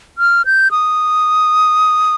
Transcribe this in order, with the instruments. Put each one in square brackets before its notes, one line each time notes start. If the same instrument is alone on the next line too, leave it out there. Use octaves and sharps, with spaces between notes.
[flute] F6
G6
D#6